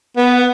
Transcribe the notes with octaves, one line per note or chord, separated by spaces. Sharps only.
B3